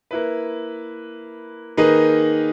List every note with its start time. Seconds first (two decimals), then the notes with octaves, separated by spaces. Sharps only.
0.11 A#3 E4 B4
1.77 D#3 A#3 D#4 G#4 B4